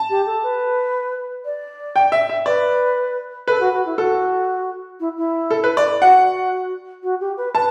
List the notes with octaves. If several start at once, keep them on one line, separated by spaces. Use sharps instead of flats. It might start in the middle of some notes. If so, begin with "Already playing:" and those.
Already playing: A5
G4
A4
B4
D5
G5
E5
E5
B4 D5
A4 B4
F#4
F#4
E4
F#4 A4
E4
E4
A4
B4
D5
F#4 F#5
F#4
G4
B4
B4 A5